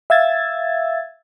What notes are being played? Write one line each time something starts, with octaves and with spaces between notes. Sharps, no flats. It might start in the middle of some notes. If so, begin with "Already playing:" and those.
E5 F5 E6 G#6 A6